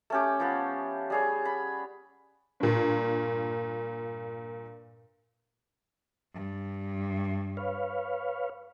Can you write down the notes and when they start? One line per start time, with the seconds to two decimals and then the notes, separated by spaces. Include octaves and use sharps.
0.10 A3 C#4 G4
0.40 F3 B3
1.10 G3 G#4 C#5
1.45 B5
2.60 G2 A#2
6.34 G2
7.57 B4 C#5 F5